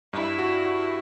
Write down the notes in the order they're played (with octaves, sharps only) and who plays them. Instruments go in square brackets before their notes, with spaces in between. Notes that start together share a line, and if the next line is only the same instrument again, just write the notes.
[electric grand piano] G2 [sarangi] E4
[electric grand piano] F#4
F#4